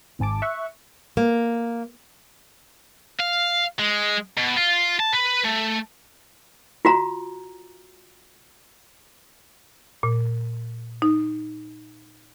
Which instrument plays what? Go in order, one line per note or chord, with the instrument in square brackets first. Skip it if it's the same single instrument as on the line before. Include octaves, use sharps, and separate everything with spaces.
[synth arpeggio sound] G#1 G#2 G#5 A5 D6
E5 C#6 F#6
[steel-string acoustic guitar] A#3
[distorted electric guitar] F5
G#3
B2
F4
A5
B4
A3
[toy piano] F4 F#4 A#5
[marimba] A#2
D#4